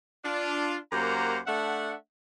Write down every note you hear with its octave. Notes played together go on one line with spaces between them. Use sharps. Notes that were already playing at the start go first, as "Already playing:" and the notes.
D4 F4
F#2 A#3 G4 C5 F#5 A#5
A3 D4 E5 F#5